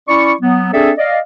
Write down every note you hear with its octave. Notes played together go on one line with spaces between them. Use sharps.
C#4 E4 D5 C#6
F#3 B3
C4 D4 G#4 A4 D5 E5
D5 D#5 F5